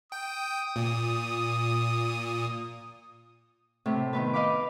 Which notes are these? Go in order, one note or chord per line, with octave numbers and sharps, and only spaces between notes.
G5 D#6
A#2
A2 C3
D#3 B3 B4
D#5 F5 B5 D6